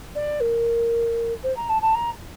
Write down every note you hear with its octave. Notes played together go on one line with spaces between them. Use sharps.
D5
A#4
C5
A#5
A5
A5
A#5